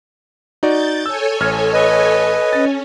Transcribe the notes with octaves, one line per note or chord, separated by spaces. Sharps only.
D#4 F#4 D5 G6 A6
A4 C#5 G#5 E6
A1 F6 G#6
B4 D#5
C#4 A6